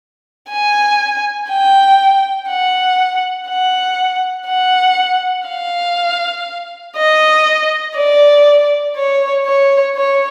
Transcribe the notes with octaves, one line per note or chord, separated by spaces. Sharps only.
G#5
G5
F#5
F#5
F#5
F5
D#5
D5
C#5
C#5
C#5